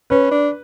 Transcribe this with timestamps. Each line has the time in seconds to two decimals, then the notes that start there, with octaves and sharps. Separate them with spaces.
0.10 C#4 B4
0.31 D4